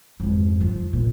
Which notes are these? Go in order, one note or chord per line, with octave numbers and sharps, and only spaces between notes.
F2 G#2
F3
A#2